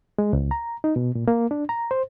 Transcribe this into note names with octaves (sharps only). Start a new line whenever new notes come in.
G#3
C#2
A#5
D#4
B2
A#2
A#3
D4
A#5
C5